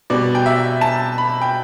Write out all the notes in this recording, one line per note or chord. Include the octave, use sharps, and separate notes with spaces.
B2 G3 D5
G5
E5
A5
B5
G5